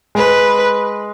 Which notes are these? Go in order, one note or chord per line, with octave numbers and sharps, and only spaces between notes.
G#3 B4